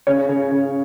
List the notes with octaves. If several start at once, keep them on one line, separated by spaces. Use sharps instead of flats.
C#3 C#5
C#3
C#3